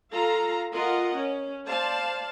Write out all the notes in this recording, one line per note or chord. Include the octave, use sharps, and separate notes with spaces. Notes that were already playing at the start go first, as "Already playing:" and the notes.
F4 A4 F5 A#5
F4 A#4 D#5 F#5
C#4
C5 D5 F5 A5